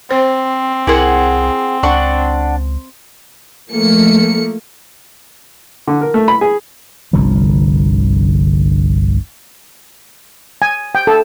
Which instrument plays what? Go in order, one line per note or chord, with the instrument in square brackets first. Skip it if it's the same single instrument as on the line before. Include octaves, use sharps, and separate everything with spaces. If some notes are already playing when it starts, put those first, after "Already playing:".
[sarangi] C4 [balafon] C5
[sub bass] C2 [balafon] E4 A#4 C6 [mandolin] G#4 F#5
[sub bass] C#2 [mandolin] D4 F#5 C#6
[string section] F3 A3 A#3 C#7
[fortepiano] D3
A#4
A3
B5
G#4
[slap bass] G1 C2 D3 F3
[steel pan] G#5
G5
A4